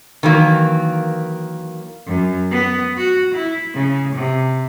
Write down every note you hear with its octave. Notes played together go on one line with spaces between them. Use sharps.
D#3 E3 F#3 A#3
F#2
B3
F#4
E4
C#3
C3